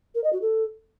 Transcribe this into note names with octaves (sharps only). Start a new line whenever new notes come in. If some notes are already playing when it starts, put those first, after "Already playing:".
A#4
D#5
F#4
A4